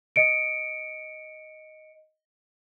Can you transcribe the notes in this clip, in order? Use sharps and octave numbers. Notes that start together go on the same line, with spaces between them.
D#5 C#7 D7